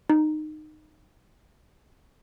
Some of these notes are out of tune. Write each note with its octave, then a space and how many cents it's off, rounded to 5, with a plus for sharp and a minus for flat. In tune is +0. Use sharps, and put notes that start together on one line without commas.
D#4 -20